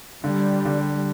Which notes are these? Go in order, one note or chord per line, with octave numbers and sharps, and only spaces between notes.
D3 G3
D3